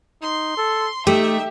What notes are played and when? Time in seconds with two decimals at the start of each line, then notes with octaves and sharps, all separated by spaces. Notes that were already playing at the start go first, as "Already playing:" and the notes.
0.22 D#4 C6
0.57 A4
1.07 A3 D#4 G4 E5